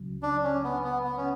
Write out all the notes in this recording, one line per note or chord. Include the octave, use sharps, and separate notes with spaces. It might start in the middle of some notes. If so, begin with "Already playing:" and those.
Already playing: C#2 C#3 F#3
D4
C#4
B3
B3
B3
C#4